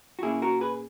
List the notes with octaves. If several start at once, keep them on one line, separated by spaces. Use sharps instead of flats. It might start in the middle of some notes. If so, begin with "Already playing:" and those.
F#4
A#2 A#3 C#4 E4 G#4
F#4 A#4
G#4 B4